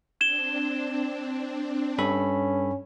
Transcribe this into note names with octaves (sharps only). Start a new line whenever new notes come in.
C4 D4 G#6 E7 G7
G2 C#4 A4 B5